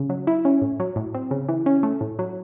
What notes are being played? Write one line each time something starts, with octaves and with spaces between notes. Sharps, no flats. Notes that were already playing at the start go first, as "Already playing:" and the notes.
Already playing: C#3
F#3
E4
C#4
A2
F#3
A2
C4
C#3
E3
C#4
A3
A2
F#3